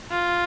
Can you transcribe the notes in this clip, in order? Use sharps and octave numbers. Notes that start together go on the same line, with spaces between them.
F4